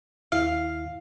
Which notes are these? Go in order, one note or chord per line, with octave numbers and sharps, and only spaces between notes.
D#2 E4 F5 F6